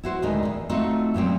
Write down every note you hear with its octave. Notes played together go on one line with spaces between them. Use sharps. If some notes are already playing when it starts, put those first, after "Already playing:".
E4 F#4 C5
D2 A2 D#3 G#3 D#4 G#4
E2
A3 C4 D#4 F4 F#4
F#2 A#2 F3 C4